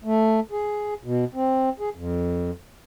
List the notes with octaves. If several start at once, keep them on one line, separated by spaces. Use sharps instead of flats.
A3
G#4
B2
C4
G#4
F2